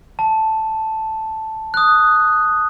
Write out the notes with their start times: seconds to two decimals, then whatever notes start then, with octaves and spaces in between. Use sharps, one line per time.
0.19 A5
1.74 D#6 F#6